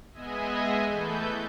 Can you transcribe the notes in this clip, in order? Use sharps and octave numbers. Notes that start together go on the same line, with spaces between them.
G#3 B3 G#4 D#5 E5 G#5
E3 A3 A4 B4 G6